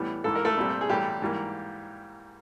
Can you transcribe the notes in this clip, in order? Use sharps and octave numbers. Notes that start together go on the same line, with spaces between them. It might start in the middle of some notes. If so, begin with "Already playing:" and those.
Already playing: A2 E3 G3 B3
A#1 G#2 E3 A4
A#4
A3 A4
C2 A#2 G3 C4
G#4
B1 A2 E3 G3 A3 G4
G#2 E3 G3 A#3